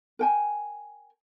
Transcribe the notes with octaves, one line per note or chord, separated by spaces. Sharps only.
A#4 G5 G#5